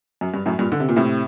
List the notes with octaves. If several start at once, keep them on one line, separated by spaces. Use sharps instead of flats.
F#2
G2
F#2 A2
G2 A#2
D3
C3
A#2
A2 C3